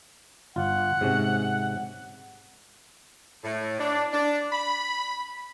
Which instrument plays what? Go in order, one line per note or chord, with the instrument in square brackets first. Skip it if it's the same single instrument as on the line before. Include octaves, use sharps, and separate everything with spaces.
[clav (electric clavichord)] G1 F4 [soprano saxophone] F#5
[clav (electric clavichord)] G#2 C3 C#4
[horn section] A2
D4
D4
B5